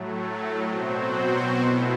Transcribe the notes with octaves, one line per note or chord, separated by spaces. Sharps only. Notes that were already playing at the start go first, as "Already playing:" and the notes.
Already playing: A2 F#3 A3
B2 F#3 C4 F#4 C5
B2 A3 E4